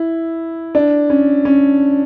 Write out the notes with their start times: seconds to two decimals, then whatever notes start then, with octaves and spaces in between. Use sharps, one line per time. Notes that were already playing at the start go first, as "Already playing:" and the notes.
Already playing: E4
0.75 D4
1.10 C#4
1.45 C#4